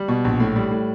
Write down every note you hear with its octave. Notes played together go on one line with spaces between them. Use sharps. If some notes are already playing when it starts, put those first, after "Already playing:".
Already playing: G3
B2
A#1
A2
G3
A2